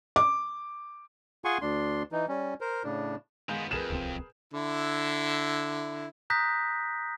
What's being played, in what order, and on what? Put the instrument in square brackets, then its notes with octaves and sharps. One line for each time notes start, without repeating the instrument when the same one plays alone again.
[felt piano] D6
[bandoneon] F4 G#4 F#5 G#5 C6 C#6
D2 D4 C6
E3 D#4
G3 C#4
A#4 C5
A2 C#3 D4
[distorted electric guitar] D#3 B3 [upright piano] G#3 F5 G6
[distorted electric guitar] F2 [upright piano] G#4 A#4 B4 [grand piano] E7
[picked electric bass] D1 C2 C4
[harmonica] D3 E4
[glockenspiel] A#5 D#6 F#6 G6 A#6 B6